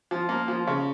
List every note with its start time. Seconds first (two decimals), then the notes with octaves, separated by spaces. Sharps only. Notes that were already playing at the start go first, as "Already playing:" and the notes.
0.11 F3
0.29 A#3
0.48 F3
0.67 C#3